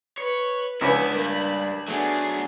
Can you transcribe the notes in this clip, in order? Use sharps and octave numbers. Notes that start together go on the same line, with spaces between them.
B4 C#5
C#2 F3 B3 C#4 D4 E4 B4 B5
G2 A#3 A#4 E5
F#3 A3 B3 D4 G#4